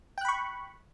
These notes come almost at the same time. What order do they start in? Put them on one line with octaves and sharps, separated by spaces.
G5 F#6 B5 C#6